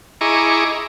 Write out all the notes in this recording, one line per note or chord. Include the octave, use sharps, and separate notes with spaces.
E4 G#4 D#5 A#5 C#6 D6